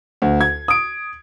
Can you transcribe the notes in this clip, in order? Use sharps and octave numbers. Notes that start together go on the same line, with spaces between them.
D2
G#6
D#6 D7